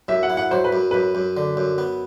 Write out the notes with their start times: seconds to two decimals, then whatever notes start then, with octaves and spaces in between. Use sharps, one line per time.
0.08 F#2 E5
0.23 F#5
0.30 E4
0.37 F#5
0.51 F#3 C5
0.64 B4
0.73 F#2
0.91 F#2 B4
1.15 F#2
1.37 D3
1.57 F#2
1.78 B3